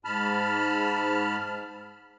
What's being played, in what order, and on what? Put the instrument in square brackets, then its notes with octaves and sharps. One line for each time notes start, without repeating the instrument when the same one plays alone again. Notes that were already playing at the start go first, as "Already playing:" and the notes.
[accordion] G#2 A5 B5 F6